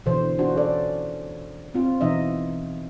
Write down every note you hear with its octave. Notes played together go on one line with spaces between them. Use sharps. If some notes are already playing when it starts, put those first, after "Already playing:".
B2 D3 E3 C5
C#4 D4 F4 F#4 C5
C#4 A4 D5
C4 F4
B2 E3 D#4 D#5 E5